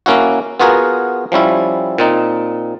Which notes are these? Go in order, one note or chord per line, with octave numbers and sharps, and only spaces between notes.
A#3 C#4 E4 F#4
B3 F4 F#4 G#4 A#4
F3 G3 C#4 E4
A#2 C4 D#4